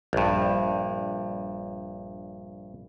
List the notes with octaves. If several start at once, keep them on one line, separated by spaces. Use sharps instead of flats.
A#1 G2